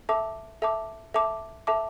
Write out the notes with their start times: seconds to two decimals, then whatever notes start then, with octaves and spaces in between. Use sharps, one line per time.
0.09 A4 E5 A5 D6
0.62 A4 E5 A5 D6
1.14 A4 E5 A5 D6
1.67 A4 E5 A5 D6